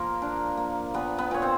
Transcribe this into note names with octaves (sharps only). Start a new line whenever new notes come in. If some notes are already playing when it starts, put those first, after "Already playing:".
Already playing: F3 A#3 A#4
D4
A#3
A#2 B3 B4
B3 B4
A#2 C#5
C4 C5